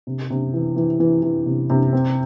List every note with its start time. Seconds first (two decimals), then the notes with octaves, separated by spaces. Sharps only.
0.07 C3
0.30 C3
0.53 E3
0.76 E3
1.00 E3
1.23 E3
1.46 C3
1.70 C3
1.93 C4